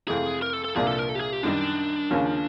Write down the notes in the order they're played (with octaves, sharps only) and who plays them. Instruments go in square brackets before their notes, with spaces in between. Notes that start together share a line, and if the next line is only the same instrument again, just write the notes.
[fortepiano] F2 C3 E3 A3 [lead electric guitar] G#4
[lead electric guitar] A#4
A4
A4
[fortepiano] C2 A#2 F3 A#3 D4 [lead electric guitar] G#4
[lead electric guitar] A4
A#4
A4
G4
G#4
G4
[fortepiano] F#2 D#3 G3 [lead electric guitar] D4
[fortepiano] D#2 C#3 F3 A#3 C#4